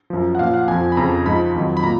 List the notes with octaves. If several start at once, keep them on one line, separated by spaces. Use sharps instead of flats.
F#2 F3
F#5
A#2 F3 F5
F#5
F2 F3 G#5
B5
F2 C#3 F3 A#5
G#2 F3 B5
F2 D#3 F#3
B5
A#2 A#5